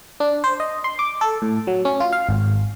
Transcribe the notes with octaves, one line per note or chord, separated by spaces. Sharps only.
D4
C5
D#5
C6
D6
A4
A2
F#3
C#4
F4
F5
G#1